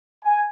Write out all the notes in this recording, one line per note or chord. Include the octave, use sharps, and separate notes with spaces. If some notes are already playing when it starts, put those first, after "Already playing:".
G#5